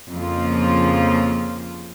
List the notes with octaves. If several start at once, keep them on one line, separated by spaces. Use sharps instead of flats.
F2 C#3 F3 A#3 F4